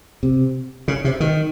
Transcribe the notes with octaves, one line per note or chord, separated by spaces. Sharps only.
C3
C#3
C3
D#3